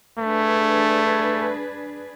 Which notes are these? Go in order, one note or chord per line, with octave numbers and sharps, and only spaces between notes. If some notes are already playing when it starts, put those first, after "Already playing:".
A3 D4 G#4 B4